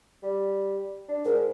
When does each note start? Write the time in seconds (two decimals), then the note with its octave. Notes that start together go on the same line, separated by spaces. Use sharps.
0.23 G3
1.09 D4
1.25 G#2 A#4